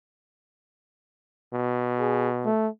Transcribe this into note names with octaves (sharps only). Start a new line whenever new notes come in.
B2
G#4
A3